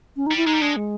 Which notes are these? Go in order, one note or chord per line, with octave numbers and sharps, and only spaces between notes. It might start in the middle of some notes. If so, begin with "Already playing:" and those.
C#4
D#4
G3
E4
G#3 D#4
G3
G#3 D4
G#3